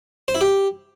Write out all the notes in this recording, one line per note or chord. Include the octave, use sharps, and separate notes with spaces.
C5
E4
G4